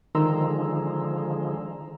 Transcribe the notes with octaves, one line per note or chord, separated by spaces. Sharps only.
D3 D#3 F3 G#3 A#5 C6 E6